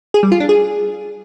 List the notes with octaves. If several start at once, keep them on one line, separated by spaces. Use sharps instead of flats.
G#4
G3
F4
D4
G#4